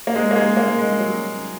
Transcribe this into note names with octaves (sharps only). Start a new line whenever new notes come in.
A#3
G#3
A#3
G#3
A#3
G#3
F#3